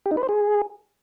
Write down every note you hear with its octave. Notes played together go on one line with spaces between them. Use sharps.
G4
D#4
B4
C5
G#4